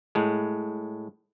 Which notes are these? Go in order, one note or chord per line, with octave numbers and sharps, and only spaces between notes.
A2 G#3